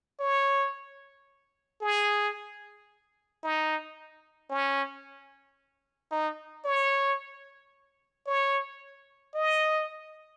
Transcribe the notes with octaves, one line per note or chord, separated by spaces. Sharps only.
C#5
G#4
D#4
C#4
D#4
C#5
C#5
D#5